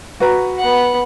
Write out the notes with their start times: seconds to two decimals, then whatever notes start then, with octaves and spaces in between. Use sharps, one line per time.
0.20 F#4 B4 A#5
0.59 B3 F#5